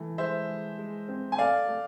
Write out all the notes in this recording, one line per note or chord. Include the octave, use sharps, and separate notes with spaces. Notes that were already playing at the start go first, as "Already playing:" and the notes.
Already playing: E3 A3
G#3 C5 E5
G#3
G#3
C4
G#5
A3 D5 F5
A3